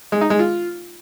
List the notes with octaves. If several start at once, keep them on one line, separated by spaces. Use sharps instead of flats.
G#3
D#4
G#3
F4